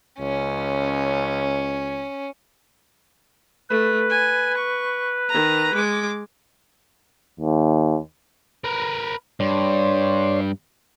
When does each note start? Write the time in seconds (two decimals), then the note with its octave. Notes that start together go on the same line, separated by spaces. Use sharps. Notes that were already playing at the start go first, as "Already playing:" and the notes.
0.20 C#2 C#4
3.70 A3 B4
4.09 G#5
4.57 C#6
5.29 D#3 A#5
5.74 G#3 D6
7.40 D#2
8.64 A#4 B4
9.40 G2 C#5 D5 C6